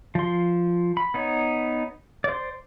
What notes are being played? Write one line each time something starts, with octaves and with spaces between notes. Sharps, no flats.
F3 C6
B5
B3 D#4 C#5
C5 D5